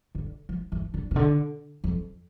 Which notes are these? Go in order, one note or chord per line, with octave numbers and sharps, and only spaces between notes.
D3
F3
E3
D3
C3
D3
F2